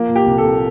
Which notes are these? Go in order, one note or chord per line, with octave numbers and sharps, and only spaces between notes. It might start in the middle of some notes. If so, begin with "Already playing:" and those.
Already playing: F3 A#3
A#2
G4
C2
A4
C2